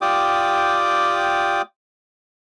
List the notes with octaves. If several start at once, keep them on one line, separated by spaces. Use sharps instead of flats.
F4 G4 D5 G5 D6 D#6